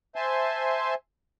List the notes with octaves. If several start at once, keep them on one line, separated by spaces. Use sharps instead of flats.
C5 E5 G#5 A5 C6